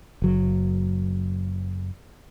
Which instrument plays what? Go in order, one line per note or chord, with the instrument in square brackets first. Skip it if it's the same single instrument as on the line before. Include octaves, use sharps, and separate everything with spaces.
[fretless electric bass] F#1 F#3